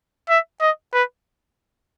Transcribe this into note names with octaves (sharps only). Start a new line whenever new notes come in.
E5
D#5
B4